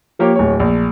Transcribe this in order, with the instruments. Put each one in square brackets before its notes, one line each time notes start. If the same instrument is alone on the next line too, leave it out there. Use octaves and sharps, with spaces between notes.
[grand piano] F3 A#3 G4 C#5
D1 C#5
A#1